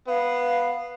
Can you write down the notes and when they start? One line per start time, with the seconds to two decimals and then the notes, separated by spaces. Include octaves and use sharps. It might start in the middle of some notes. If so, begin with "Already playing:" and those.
0.08 B3 F5